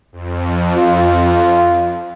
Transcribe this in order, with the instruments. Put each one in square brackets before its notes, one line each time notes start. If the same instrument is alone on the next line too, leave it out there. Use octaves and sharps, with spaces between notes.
[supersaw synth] F2
[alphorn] F4